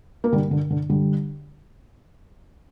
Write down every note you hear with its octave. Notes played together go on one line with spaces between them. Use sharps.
A#3
D3 G3
D3
D3
D3 G3